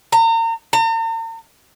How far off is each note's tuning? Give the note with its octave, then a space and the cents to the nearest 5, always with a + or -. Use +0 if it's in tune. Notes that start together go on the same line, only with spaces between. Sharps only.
A#5 -35
A#5 -45